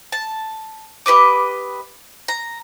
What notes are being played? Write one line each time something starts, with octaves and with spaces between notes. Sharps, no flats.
A5
G4 B4 D#5 D6
A#5